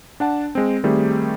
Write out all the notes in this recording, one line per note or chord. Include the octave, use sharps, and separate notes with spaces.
D4 F#5 A5
G#3 C4
D#3 G3 A3 C4 G4 G#4